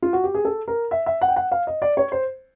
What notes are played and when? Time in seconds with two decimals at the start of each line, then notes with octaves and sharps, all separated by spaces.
0.02 F4
0.13 F#4
0.24 G4
0.35 G#4
0.45 A4
0.68 A#4
0.91 E5
1.06 E5
1.21 F#5
1.28 G5
1.36 F#5
1.52 F5
1.67 D#5
1.82 D5
1.97 C#5
2.12 C5